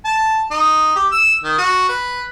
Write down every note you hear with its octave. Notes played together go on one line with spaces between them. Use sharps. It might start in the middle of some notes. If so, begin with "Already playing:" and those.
A5
D#4
G4
E6
D#3
F#4
B4